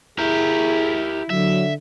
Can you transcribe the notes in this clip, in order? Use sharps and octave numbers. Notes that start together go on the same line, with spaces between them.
E4 G4 G#4 A#4
D3 F#3 E5